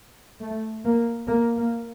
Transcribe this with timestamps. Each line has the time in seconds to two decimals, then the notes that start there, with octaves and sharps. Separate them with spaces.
0.41 A3
0.85 A#3
1.27 A#3
1.56 A#3